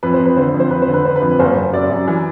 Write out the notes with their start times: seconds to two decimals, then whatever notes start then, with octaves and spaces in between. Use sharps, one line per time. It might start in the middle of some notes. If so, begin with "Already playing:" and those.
0.03 F2 B4
0.14 C5
0.20 F2
0.25 B4
0.37 D3 C5
0.48 B4
0.54 F2
0.60 C5
0.71 F2 B4
0.82 C5
0.88 D3
0.94 B4
1.05 D3 C5
1.16 B4
1.22 F2
1.39 F#1 C5
1.56 F#1
1.73 F#2 D5
1.90 F#2
2.08 E3